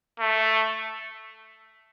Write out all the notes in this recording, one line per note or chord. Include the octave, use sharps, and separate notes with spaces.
A3